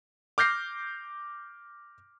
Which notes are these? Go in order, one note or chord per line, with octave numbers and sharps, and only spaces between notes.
D6 F6 G6 A#6 C7